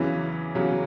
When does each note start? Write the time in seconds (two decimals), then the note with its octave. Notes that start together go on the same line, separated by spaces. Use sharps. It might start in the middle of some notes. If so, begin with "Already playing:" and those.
Already playing: E2 C#3 E3 F#3 C#4
0.55 E2 C#3 F#3 C#4